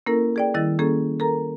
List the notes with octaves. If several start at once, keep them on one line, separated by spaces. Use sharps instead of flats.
A#3 C#4 E4 A4 A#4
G#4 D5 G5
D#3 G3 E4 D#5 A6
A#3 C#4 G#4 A4
A4 A#4 A#5